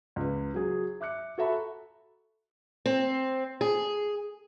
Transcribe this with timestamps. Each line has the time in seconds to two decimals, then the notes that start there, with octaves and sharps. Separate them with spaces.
0.16 C#2 B4
0.54 F#3 G#4
1.01 E5 D6 F#6 C#7
1.38 F#4 A4 E5 A#5 B5
2.86 C4
3.61 G#4